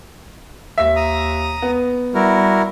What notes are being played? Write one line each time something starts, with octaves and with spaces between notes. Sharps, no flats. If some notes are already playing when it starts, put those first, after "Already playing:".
D#2 E5 B6
A#5 D#6
B3
G3 E4 F#4 A#4